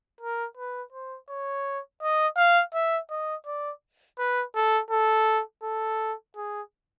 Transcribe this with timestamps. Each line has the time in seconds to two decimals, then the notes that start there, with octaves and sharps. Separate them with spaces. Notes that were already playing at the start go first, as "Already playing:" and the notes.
0.21 A#4
0.57 B4
0.93 C5
1.29 C#5
2.02 D#5
2.37 F5
2.74 E5
3.10 D#5
3.46 D5
4.19 B4
4.55 A4
4.91 A4
5.63 A4
6.36 G#4